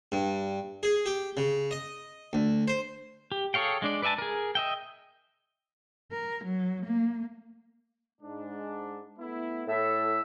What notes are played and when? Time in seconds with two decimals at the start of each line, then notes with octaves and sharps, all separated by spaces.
0.12 G2
0.83 G#4
1.06 G4
1.37 C#3
1.71 D#5
2.33 D2
2.68 C5
3.32 G4
3.54 G#4 A4 C#5 F5 G5
3.82 G#3 D4 D5
4.02 B4 D5 E5 G#5 A5
4.18 G#4 A#4
4.55 D#5 E5 G5
6.12 A#4
6.45 F#3
6.86 A#3
8.21 G#2 D4
9.19 A3 B3 E4
9.68 A2 A4 E5